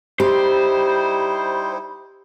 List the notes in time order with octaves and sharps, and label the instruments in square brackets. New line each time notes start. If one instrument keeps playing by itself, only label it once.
[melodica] G3 D#4 E4 [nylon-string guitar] G4 [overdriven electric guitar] C5